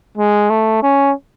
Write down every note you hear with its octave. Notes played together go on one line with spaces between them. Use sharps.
G#3
A3
C#4